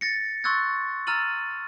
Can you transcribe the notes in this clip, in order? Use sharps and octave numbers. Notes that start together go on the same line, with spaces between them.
A6 A#6 C#7
C6 C#6 E6 F#6 G#6 A6
A#5 E6 F6 A6 D#7 F#7